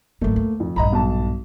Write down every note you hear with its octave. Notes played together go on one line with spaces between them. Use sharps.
G#1 F#3 A3 A#3
D2
F2
A#1 G2 D#5 A#5 B5
B1 A5